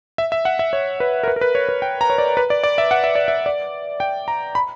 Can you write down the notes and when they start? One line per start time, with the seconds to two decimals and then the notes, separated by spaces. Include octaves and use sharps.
0.18 E5
0.32 E5
0.45 F#5
0.59 E5
0.73 C#5
1.00 B4
1.23 A#4
1.28 B4
1.36 A#4
1.41 B4
1.55 C#5
1.69 B4
1.82 G5
2.01 A#5
2.10 C#5
2.18 D5
2.37 B4
2.50 D5
2.64 D5
2.78 E5
2.91 F#5
3.04 E5
3.15 D5
3.28 E5
3.46 D5
4.00 G5
4.28 A#5
4.55 B5